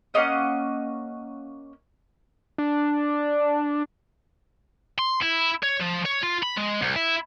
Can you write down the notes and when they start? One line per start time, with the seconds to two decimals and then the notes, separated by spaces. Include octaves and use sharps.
0.14 A#3 C#4 D#5 F#5
2.58 D4
4.99 C6
5.22 E4
5.63 C#5
5.80 F3
6.05 C#5
6.23 F4
6.43 B5
6.58 G#3
6.82 C2
6.96 E4